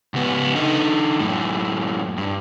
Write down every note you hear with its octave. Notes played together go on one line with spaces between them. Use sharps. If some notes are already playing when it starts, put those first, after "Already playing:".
C#2 B3
D3 D#4
F#2 A2
G2